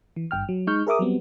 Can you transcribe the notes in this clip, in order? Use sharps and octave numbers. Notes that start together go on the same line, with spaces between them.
E3
G#1 G2 G5 F6
F#3
G#3 D#4 C#6 F6 G6
G#4 A#4 E5 D6 D#6
F#3 G3 B3 C4